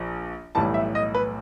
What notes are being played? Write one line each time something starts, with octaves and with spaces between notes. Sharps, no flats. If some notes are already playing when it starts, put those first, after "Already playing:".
Already playing: A#1 F3
B1 A2 E3 G3 A5
E5
D#5
B4